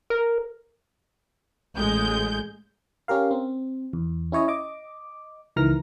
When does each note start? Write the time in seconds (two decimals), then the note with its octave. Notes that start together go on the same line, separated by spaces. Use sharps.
0.10 A#4
1.76 A1 G#3 G6
3.08 C#4 G4 A#4 F5
3.31 C4
3.93 E2
4.32 C#4 E4 C#5 D#5
4.48 D#5 D6
5.56 C#2 D#3 E3 A#5 F6 A#6